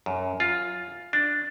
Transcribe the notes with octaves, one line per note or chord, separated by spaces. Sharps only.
F#2
F4
D4